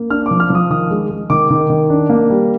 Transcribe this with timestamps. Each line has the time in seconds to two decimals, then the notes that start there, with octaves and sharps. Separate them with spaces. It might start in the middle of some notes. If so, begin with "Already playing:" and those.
Already playing: A#3
0.10 D4 F6
0.26 F3 D6
0.40 F6
0.50 F3 D#6
0.70 D#3 D#6
0.90 G#3
1.11 G#3
1.30 D#3 D6
1.50 D#3
1.70 D#3
1.90 D4
2.10 A#3
2.30 G3